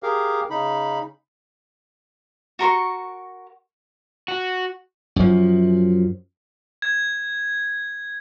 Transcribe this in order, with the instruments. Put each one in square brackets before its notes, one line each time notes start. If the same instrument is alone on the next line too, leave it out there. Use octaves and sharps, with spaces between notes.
[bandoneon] G4 G#4 A#4 F5
C#3 D#4 B5
[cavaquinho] F#4 A#4 C6 C#6
[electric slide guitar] F#4
[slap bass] F#2 F3
[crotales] G#6